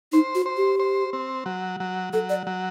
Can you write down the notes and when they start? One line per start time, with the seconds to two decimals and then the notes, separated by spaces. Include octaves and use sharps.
0.12 D#4 C5
0.35 F#4
0.46 C5
0.57 G4
0.79 C5
1.13 C4
1.46 F#3
1.80 F#3
2.13 F#3 A4
2.30 D5
2.47 F#3